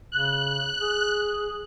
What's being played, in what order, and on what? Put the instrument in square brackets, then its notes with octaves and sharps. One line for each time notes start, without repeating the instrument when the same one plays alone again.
[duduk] C#3 [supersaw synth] F#6
[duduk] G#4